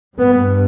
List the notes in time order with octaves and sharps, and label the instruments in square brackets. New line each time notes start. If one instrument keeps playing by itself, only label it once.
[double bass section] G2 B3